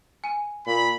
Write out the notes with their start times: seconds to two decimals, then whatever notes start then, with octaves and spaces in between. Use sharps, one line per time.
0.24 G#5 D#7
0.67 A#2 B5